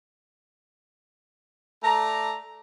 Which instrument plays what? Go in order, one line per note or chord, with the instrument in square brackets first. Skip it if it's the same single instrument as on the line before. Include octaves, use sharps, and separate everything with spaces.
[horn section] A3 D5 A#5